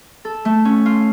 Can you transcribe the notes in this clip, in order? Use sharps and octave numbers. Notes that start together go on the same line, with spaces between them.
A4
A3
C#4
F4